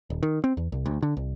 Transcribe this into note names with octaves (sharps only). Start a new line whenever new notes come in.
D#1
D#3
C4
E2
C2
D2
D3
C2